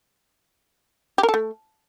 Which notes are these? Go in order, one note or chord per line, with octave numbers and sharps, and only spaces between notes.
G4
A#4
A4
A3